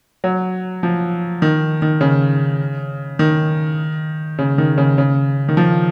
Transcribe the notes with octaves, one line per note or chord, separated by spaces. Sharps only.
F#3
F3
D#3
D#3
C#3
D#3
C#3
D#3
C#3
C#3
D#3
F3